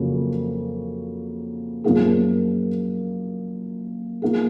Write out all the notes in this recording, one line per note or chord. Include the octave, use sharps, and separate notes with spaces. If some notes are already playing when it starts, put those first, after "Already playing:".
Already playing: F2 C#3 F#3 A#3
F#2 F3 A#3 D#4 G#4
F3 A#3 D#4 G#4